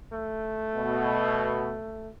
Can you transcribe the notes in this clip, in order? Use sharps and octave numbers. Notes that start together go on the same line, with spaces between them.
A3
B2